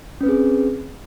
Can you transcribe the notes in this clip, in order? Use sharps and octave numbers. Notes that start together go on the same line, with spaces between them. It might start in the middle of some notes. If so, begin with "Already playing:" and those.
C4 C#4 G#4 B4